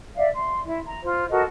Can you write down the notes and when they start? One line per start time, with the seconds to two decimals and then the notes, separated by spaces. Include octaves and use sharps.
0.15 D5 E5 F5
0.34 C6
0.65 E4
0.86 A#5
1.02 F4 C5
1.30 F#4 A4 A#4 D#5